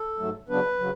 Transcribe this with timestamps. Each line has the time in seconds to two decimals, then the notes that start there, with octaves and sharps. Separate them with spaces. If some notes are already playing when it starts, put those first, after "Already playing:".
Already playing: A4
0.19 G#2 F#3 A3
0.49 C#3 F#3 B3 D4 B4
0.80 C#3 F#3